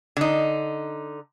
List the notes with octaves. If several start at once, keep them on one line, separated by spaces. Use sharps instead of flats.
D3 D#4